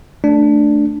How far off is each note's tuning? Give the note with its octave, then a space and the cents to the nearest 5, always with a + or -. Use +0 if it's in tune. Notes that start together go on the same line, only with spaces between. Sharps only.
A3 +0 D4 +0